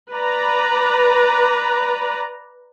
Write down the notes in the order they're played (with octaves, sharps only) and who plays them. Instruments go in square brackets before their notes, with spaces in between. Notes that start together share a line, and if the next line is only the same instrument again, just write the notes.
[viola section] B4 D5 A#5